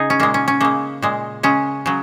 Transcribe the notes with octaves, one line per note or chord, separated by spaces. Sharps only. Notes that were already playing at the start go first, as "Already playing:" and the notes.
Already playing: C#3 D#4 G#4
C#4
A#2 G#3 A#3
C#4
C#4
C#3 G#3 A#3
A#2 G#3
C#3 G#3 C#4
C#3 F#3